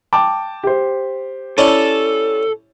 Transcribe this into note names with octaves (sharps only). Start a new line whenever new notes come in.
G5 A5 D6
G4 C5
C#4 E4 A4 D5